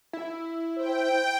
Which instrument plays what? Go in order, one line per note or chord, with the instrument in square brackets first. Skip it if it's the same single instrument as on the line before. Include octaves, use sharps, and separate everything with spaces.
[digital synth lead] E4
[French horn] C5 [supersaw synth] G5